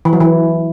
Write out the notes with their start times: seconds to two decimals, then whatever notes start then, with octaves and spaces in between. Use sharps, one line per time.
0.05 E3
0.13 F#3
0.20 E3